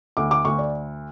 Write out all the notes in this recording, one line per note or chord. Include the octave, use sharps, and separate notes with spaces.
D2 D6
D6
D2 C#6
D5